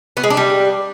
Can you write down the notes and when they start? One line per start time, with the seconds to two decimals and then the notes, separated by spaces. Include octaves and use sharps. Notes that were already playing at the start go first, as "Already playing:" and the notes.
0.17 B3
0.23 G#3
0.30 D4
0.37 G3